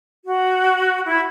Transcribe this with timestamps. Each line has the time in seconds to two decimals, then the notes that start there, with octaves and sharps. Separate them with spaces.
0.24 F#4
1.06 E4